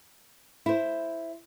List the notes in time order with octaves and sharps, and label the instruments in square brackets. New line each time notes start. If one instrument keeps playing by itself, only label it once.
[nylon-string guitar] E4 C5